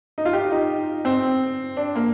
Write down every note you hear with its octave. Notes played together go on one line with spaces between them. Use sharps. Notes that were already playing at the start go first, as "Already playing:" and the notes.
D#4
F4
G4
D#4
C4
D4
A#3